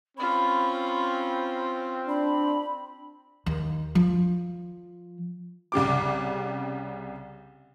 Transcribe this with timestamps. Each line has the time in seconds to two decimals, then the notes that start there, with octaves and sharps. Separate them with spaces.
0.17 C4 C#4 F4 B5
2.08 D4 B5
3.46 D#2
3.95 F3
5.72 C2 C#3 G4 D6